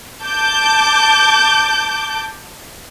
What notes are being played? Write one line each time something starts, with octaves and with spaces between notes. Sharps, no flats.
A5 D6 G6